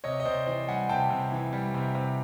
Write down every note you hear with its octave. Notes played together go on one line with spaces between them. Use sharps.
C3 C#5 D#5
D#5
C3 C5 D5
E3 C5 D5
G3 F#5 G#5
C3 G5 A5
C3
E3
G3
C3
C3